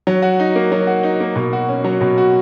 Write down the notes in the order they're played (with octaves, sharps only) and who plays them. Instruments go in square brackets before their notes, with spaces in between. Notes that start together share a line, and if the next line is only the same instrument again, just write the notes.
[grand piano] F#3
F#4
D#4
A#3
F#3
F#4
D#4
A#3
B2
F#4
C#4
F#3
B2
F#4